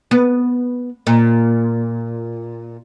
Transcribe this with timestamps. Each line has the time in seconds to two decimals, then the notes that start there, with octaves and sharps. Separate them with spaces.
0.11 B3
1.07 A#2